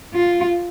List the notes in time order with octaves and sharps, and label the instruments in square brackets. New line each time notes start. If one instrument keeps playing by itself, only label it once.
[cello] F4